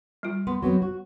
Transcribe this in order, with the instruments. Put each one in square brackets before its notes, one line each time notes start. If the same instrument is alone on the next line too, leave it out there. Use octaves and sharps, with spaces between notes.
[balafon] G3 F4
[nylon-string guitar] B3 [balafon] C6
[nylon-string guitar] F#3 B3 C4
F#4